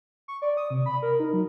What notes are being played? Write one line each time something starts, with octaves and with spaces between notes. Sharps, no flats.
C#6
D5
D#6
C3
B5
A#4
D#4
F#3